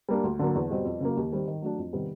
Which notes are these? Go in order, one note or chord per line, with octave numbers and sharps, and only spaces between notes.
G3 A#3 D4
D2
D3 F#3 A#3
E2
B2 G3 C4
F2
C#3 F#3 A#3
D#2
D#3 G3 C4
D#3
F#3 A3 D4
F2
C3 D#3 G3 B3